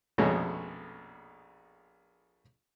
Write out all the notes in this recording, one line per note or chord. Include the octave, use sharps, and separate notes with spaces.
A#1 F2 B2 G#3 A3 C#4